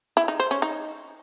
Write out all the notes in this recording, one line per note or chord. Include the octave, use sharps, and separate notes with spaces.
E4
D#4
C5
C#4
D#4